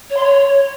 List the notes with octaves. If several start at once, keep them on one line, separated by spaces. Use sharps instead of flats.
C#5
C6
C#5